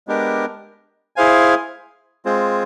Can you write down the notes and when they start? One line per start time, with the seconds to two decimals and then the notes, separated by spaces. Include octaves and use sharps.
0.08 G#3 B3 D4 G4 A#4
1.16 E4 G#4 C5 F5 G#5
2.25 G#3 C4 F4 G#4 C5